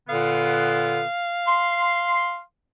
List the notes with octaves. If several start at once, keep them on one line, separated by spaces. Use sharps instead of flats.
A#2 D3 B3 F5
C6